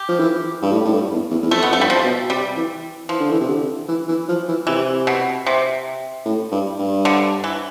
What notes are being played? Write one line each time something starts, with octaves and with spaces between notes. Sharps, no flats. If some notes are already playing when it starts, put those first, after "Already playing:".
Already playing: G4
F3
E3
G2
A2
A2
G2
E2
E2
E2
F2 A3
B3
F2
A3
G2
G3
F3
B2
C3 G3
E3
E3 F3
D3
E3
C3
D3
E3
E3
F3
E3
C3 E3
B2
C3
A2
G2
G2
D3
E3